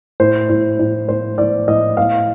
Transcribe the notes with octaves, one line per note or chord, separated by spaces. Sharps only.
A2 C5
A2
A2
A2 C5
A2 D5
A2 D#5
A2 F5